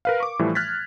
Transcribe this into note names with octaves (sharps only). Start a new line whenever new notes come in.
A#4 B4 F5
C#6 D6
A2 E3 F3 G3 A3
F6 F#6 G#6 A6 B6